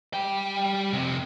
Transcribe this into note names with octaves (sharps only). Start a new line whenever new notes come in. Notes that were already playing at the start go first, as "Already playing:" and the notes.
G3 G5
F2 C3